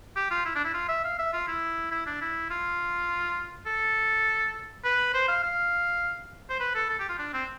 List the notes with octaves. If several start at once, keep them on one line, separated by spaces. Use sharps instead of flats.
G4
F4
E4
D4
E4
F4
E5
F5
E5
F4
E4
E4
D4
E4
F4
A4
B4
C5
F5
F5
C5
B4
A4
A4
G4
F4
D4
C4